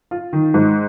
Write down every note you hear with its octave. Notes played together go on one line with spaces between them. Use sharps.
F4
D#3
G#2